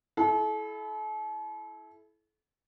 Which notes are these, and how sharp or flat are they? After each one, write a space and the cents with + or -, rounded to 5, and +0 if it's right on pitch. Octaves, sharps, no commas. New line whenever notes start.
E4 +0 A4 -40